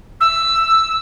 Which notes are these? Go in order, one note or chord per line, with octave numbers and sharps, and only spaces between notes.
E6